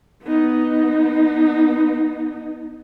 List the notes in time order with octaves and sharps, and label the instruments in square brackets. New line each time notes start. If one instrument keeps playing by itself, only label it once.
[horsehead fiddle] B3 D#4